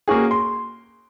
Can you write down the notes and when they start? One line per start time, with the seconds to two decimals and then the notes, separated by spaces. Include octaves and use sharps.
0.08 A#3 C#4 F#4 G#4
0.31 C6